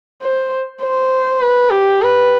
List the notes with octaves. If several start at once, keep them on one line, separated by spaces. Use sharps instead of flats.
C5
C5
B4
G4
B4